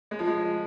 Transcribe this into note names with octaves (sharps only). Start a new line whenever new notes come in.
G#3
F3
G#3